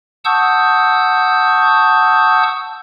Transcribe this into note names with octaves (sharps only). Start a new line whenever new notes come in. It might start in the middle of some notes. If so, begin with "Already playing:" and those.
F#5 A5 C#6 D#6 E6 G6